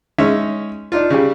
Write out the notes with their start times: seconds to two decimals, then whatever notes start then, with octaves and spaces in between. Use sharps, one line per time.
0.18 G#3 C#4 D#4 C#5 E5
0.92 D4 D#4 F4
1.10 C#3 G3